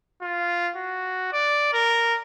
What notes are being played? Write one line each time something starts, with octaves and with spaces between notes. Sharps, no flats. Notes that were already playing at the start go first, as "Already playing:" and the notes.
F4
F#4
D5
A#4